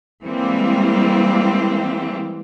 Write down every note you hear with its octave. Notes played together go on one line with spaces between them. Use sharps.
E3 G3 G#3 A#3 C4